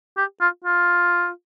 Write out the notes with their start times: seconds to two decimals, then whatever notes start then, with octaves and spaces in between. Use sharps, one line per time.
0.17 G4
0.41 F4
0.65 F4